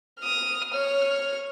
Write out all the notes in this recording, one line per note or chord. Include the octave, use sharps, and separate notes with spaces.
D#6 F6
C#5 F6